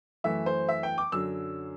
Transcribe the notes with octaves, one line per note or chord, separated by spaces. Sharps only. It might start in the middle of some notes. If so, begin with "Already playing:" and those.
F#2 E3 A3 E5
C5
E5
G5
D6
F#2 D3 F#3 E6